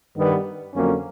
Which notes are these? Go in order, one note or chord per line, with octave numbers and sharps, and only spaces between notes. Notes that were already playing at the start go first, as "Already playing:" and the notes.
G2 D#3 G3 B3
F2 D3 F#3 A#3 C#4